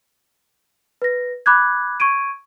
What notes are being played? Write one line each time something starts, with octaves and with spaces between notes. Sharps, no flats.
B4 A#6
B5 D6 F#6 G#6
C#6 G#6 D7 D#7